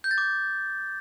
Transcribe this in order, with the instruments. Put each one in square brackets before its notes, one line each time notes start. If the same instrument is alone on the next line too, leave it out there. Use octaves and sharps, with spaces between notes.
[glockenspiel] G6
A6
D6